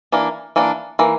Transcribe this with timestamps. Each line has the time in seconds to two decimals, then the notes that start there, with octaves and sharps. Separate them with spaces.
0.12 E3 A#3 D4
0.56 E3 A#3 D4
0.99 E3 A#3